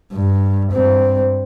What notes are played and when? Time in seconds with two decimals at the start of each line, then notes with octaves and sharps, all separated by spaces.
0.13 G2
0.72 G2 C4